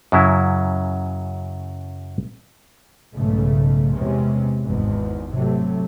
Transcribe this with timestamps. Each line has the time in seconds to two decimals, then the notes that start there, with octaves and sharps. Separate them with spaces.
0.12 F#2 C#3 F#3 E4
3.14 B1 G#2 C#3 A3
3.94 E2 C3 G#3 C#4
4.63 G#1 E2 G#2
5.32 C3 F#3 A3